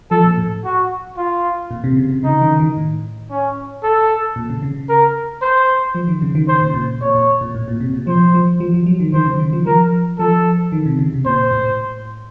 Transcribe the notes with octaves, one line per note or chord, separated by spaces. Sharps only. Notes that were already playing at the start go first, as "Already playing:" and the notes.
F3 A4
A#2
A2
F#4
F4
A#2
C3
C#3
C3
C#3 D#4
D#3
D#3
A2
C#4
A4
A#2
C#3
C#3
A#4
C5
F3
D#3
C#3
D#3
C#3 C5
A#2
A#2
A#2 C#5
A#2
A#2
A2
A#2
C3
A#2
F3 C5
F3
F3
F3
F#3
D#3
D#3 C5
C#3
D#3
F3
F3 A#4
F3 A4
D#3
C3
C#3
C3
A#2 C5
A2